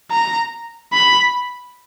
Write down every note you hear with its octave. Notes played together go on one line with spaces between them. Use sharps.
A#5
B5